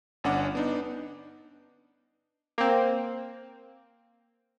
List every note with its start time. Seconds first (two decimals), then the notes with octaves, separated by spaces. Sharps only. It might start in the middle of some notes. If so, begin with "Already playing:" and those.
0.24 G1 C#4 D4 F#5 D6
0.55 B3 D4 D#4
2.58 A#3 C4